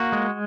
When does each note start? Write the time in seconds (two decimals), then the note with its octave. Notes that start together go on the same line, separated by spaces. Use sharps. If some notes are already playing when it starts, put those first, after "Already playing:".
Already playing: A#3 F#4
0.12 G#3